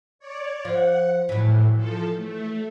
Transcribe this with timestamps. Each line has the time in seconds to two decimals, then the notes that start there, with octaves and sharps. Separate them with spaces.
0.19 C#5 D5
0.65 F3 F#5
1.29 A2 E3 F#3
1.76 F3 A4
2.17 A3